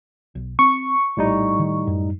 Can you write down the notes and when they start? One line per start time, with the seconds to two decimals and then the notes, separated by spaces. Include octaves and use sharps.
0.35 B1
0.59 C4 C#6
1.17 A#1 A2 G3 D#4
1.59 D#3
1.87 F#2